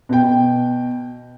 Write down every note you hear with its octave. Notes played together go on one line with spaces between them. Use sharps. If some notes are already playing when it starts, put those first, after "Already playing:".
B2 G5